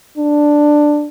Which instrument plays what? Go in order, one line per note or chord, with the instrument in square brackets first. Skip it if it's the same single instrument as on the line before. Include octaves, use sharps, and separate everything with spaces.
[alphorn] D4